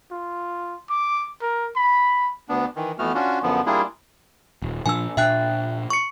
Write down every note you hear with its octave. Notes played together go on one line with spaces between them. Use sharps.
F4
D6
A#4
B5
D2 B3 D4
D#3 E3
F2 E3 A3 B3 F#4 F6
C#4 D4 F4 F#4
F#2 D3 F3 B3
G3 A#3 D4 E4 F4 G#4
D#1
A#2 F3 D4 G#5 E6
A#2 D4 E5 G5 F#6
C#6 C#7